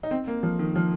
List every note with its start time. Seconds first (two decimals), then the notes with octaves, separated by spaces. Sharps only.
0.03 D#4
0.11 C4
0.27 A#3
0.43 F3
0.59 D#3
0.76 F3